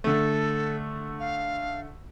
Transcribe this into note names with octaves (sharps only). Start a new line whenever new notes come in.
D3 A3 A4
F5